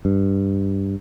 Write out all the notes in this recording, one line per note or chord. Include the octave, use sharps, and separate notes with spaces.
G2